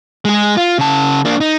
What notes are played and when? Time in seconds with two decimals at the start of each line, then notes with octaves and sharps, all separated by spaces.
0.25 G#3 G#4
0.57 F4
0.79 C#3 A5
1.25 A#3 D4
1.41 D#4